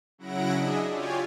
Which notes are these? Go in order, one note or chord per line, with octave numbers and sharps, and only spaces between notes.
C#3 F#3 E4 F#5 A#6 D7
D4 G#4 D#5 E5
F4 G4 C#5 D5 G#5